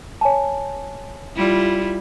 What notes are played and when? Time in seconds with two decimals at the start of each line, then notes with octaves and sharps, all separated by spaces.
0.21 C#5 G#5 A5
1.36 G3 E4 F4